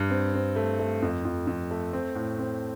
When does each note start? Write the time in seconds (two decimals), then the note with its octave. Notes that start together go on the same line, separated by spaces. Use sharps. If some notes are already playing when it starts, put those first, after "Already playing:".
Already playing: G2
0.10 C4
0.34 C4
0.56 A3
0.79 A3
1.02 F2
1.25 F2
1.47 F2
1.71 A3
1.93 C4
2.15 A2
2.38 C4